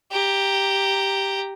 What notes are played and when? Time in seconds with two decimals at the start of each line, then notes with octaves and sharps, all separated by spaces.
0.11 G4 A#5